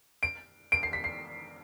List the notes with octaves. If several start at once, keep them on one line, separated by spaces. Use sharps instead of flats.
D7
D7
C7
B6
C7